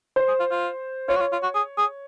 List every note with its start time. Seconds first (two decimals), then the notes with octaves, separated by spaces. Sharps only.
0.16 C5
0.28 G#4
0.40 F4
0.51 F4
1.09 F4 C#5
1.16 F#4
1.20 F4
1.32 F4
1.43 F#4
1.55 G#4
1.78 G#4